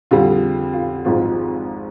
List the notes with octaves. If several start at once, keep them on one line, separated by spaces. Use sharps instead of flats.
F2 D3 G3 F4
F4
G#1 G#2 F3 G#3 F4